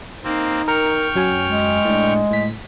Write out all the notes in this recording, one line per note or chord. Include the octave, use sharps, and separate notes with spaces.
A#3 C4 D#4
A#4 G5 C#6 F6
F#2 F#3 G#5
G#3
A2 D4
A2 B6